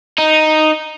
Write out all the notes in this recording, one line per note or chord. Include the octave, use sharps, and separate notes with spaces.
D#4